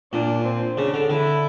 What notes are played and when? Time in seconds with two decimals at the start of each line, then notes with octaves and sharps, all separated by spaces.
0.13 A#2 D4
0.45 C4
0.77 C#3 D4
0.94 D3
1.10 D3 E4